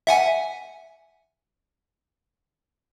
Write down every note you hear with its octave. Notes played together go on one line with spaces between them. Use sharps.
E5 F#5 G#5